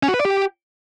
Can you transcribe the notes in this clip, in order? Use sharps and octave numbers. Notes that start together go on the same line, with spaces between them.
C#4
F#4
B4
D5
G4